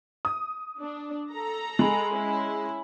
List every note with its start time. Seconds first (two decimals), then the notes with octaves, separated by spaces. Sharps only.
0.25 D#6
0.79 D4
1.32 A4 A#5
1.79 G#3 G#5 B5 F#7
2.13 C#4 E4